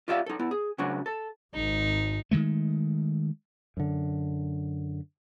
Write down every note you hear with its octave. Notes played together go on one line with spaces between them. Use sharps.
F4 G4 D5 E5 F5
D#4 A4
B3 E4
G#4
C#3 F#3 D4 F#4
A4
G#1 D#4
D#3 F3 G#3 A3
F#2 D3